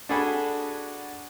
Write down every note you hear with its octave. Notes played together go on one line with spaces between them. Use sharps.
D4 F#4 G#4 A4 G#5 B5